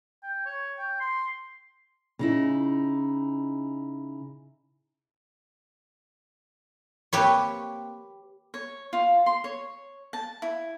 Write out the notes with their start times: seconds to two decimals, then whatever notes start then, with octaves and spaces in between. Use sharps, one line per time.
0.23 G5
0.46 C#5
0.79 G5
1.00 C6
2.19 C#3 D#4 E4
7.13 A#3 C4 G4 B4 C#5
8.54 C#5
8.93 F4
9.26 C6
9.44 C#5
10.13 A5
10.42 E4